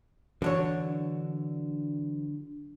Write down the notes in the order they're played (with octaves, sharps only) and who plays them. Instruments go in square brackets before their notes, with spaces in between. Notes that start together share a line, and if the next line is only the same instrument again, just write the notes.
[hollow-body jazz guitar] D3 D4 C#5 [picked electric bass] E3 F#3